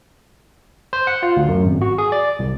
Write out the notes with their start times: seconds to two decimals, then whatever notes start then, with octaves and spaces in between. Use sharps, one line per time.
0.93 C5
1.07 F#5
1.23 F4
1.37 D2
1.48 F#2
1.65 G#1
1.81 F#4
1.98 G#4
2.12 D5
2.39 C2